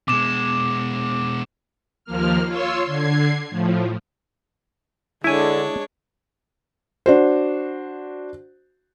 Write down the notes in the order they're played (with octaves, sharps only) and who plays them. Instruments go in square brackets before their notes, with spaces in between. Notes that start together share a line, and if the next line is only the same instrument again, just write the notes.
[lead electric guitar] B2 G#3 [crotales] D6 E7
[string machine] D#2 F3 A#3 F6
F4 C#5 C6 E6
D3 G#6 C7
A2 F3
[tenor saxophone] D3 [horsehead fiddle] G#3 [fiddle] D4 C#5 [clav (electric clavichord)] E4 G#5
[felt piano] D4 F#4 C5